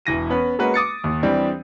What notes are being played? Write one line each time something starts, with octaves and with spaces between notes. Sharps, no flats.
E1 E3 A#6 D#7
B3 C#4 B4
G#3 A#3 C#4 F#4 B4
D6 D#6 A6 C#7
D#2 D#3
E3 G3 C4 D4 G4